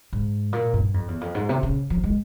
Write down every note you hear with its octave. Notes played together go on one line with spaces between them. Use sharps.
G#2
A#2
G2
F2
E2
F2
G#2
C3
C#3
F3
G#3